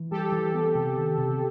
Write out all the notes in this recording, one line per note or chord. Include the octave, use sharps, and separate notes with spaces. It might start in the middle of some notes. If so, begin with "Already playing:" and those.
Already playing: E3
G3 G4 A4
E3
B3
C3
D#3
C3